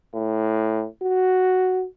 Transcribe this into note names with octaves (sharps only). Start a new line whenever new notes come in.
A2
F#4